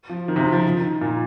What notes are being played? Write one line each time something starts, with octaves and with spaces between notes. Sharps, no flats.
F3
D#3
C3
C#3
D#3
F3
D#3
A#2